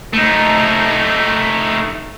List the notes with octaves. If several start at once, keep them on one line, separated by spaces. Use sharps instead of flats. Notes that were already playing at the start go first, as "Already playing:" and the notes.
A3 D#4